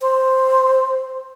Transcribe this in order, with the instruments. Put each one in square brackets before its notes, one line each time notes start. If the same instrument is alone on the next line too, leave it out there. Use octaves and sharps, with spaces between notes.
[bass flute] C5